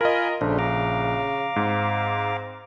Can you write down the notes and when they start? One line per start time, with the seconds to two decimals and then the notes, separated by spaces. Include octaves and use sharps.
0.01 F4 A#4 D#5 G#5 B5
0.41 A#1 C#3 D4 A4 C5
0.59 F5 A#5 D6
1.56 G#2 C4